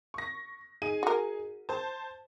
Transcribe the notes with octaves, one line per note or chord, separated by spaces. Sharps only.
C#6 A#6
D#4 G#4 D#7
F#4 A#4
C5 A5